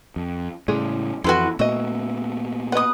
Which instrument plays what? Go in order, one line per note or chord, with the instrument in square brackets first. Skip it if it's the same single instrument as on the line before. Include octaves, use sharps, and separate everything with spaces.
[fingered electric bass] F2
[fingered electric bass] A2 C#3 [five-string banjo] G3 G#3 G#4
[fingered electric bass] F2 E3 [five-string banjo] E4 A4 [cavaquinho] F#4 B4 C6
[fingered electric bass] A#2 A3 B3 [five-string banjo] F#4 D#5 [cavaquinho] E5
[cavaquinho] B4 D#6 [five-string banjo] D#5 F#5